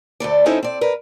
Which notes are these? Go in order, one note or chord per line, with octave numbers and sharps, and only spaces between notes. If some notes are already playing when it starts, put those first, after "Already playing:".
D2 A3 A4 D5
E2 C4 C#4 D#4 E4 A4
C4 D5
A#4 B4